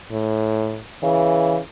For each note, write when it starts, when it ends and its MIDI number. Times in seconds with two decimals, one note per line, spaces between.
0.11 0.80 45
1.03 1.59 49
1.03 1.59 52